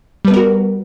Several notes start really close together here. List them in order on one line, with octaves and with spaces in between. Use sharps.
G3 B4 B3 A#4 F#4